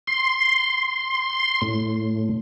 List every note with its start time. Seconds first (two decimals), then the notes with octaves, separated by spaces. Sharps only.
0.07 C6
1.62 A2